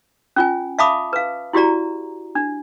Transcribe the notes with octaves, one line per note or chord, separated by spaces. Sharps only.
C#4 F4 G#5
E5 F5 A5 B5 D6 D#6
B4 F5
E4 F#4 G4 D5 A#5
D4